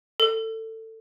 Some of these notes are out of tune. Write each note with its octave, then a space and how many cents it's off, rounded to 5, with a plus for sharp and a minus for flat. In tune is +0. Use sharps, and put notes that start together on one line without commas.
A4 +20